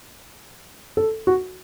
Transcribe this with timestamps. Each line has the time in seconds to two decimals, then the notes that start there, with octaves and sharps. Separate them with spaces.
0.97 A4
1.27 F#4